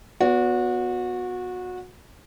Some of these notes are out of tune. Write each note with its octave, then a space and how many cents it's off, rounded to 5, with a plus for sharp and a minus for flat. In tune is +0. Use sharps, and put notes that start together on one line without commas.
B3 +0 F#4 -25 D5 -45